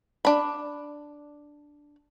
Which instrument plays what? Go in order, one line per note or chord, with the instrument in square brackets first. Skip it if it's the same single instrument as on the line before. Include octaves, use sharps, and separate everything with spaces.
[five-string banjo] D4 B5